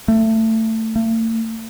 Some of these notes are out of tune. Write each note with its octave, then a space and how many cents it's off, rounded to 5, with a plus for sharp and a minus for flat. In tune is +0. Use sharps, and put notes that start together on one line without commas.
A3 +20
A3 +40